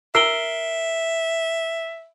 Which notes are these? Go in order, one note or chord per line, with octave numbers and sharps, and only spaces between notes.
A#4 E5 E6 C7 D7 G7